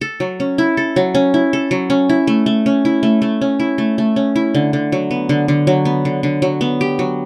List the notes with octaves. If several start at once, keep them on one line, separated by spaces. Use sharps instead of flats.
A4
F#3
C#4
E4
A4
F#3
C#4
E4
A4
F#3
C#4
E4
A3
A3
C#4
E4
A3
A3
C#4
E4
A3
A3
C#4
E4
D3
D3
F#3
B3
D3
D3
F#3
B3
D3
D3
F#3
B3
G4
F#3